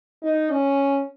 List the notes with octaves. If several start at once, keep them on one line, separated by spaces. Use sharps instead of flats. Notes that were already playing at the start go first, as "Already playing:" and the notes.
D#4
C#4